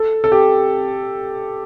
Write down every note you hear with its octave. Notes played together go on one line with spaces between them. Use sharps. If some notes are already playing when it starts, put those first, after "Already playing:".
Already playing: A4
A4
G4